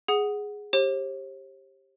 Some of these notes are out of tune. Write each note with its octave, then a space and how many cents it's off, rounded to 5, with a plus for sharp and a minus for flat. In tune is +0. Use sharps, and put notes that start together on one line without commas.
G#4 +0 F#5 +0 D#6 +0
G4 +0 C5 +45